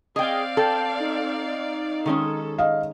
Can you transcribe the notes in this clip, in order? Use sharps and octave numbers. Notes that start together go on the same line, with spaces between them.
C4 G#4 D5 D#5 F5 G5
A4 G5
D#4
D#3 G#3 C#4 A4
D#5 F5